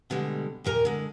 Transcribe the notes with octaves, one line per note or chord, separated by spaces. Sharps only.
B2 D3 G3 G#3
D#2 A#2 A#4 G#5 A#5
D3 G#3